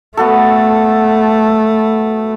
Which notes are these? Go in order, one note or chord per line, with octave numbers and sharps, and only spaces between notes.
A3 B3 F#4 A4